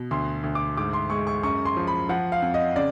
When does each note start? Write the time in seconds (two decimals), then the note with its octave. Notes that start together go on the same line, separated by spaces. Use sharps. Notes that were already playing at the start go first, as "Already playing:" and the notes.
Already playing: B2
0.11 D2 C6
0.44 D2
0.55 D6
0.77 G#2 D6
0.93 C6
1.10 G#3 C#6
1.27 C#6
1.43 F#2 C#6
1.65 C6
1.77 F3
1.87 B5
2.09 F3 F#5
2.32 F5
2.42 F2
2.54 D#5
2.76 C#3 D5